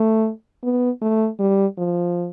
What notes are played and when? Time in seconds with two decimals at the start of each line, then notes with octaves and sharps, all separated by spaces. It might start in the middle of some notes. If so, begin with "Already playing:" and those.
Already playing: A3
0.63 B3
1.01 A3
1.40 G3
1.78 F3